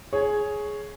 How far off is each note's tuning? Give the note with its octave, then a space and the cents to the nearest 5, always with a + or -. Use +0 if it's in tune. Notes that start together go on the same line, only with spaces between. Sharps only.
G#4 +10 C#5 +0